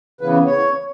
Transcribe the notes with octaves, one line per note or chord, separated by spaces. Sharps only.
C#3 E3 B3 B4
C#5